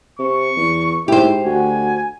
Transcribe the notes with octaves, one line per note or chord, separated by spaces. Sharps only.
C3 C#6
E2
G#2 E4 G4 C5
D2 F#4 G#5